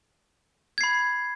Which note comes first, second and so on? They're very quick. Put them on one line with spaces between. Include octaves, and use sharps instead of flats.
G#6 C7 B5